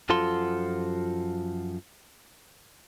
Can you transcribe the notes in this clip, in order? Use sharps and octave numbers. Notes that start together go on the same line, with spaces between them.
F#2 F3 F4 F#4 A4 C6